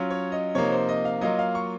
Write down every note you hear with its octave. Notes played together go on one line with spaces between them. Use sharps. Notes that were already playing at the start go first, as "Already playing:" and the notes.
Already playing: F#3 C#4 F4
C#5
D#5
C3 F3 A#3 D#4 C#5
C5
D#5
F5
F#3 A#3 F4 D#5
F5
C#6